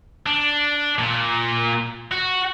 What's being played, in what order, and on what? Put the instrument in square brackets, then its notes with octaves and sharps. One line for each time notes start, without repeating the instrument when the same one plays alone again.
[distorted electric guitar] D4
A#2
F#4